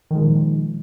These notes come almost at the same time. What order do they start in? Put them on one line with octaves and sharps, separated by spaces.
D#3 G#3 A#2 F3